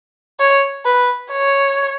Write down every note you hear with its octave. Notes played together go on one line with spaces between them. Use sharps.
C#5
B4
C#5